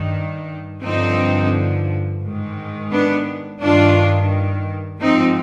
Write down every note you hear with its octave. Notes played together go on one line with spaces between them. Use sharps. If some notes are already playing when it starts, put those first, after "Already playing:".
Already playing: G2 D#3
G2 D3 F3 C4 D#4
G#2 D#3
B3 D4
G2 D#3 D4 F4
G#2 F3 C4 D#4